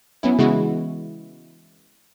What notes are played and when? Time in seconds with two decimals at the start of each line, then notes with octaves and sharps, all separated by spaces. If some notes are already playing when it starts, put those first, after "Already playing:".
0.23 F#3 B3 C#4 E4
0.39 C#3 E3 G#3 B3 E4 F#4